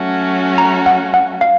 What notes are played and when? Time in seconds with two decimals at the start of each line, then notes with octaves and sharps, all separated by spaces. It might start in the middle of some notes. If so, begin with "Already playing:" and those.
Already playing: F#3 A3 C#4 F#4
0.58 A#5
0.86 F#5
1.14 F#5
1.41 F5